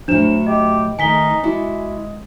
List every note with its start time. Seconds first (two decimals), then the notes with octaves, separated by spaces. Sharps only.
0.08 A2 F#3 D4 C5 E7
0.47 G4 D#5
0.99 D#3 A3 D#4 G#5 B6 G7
1.43 G#3 E4 F#4 D5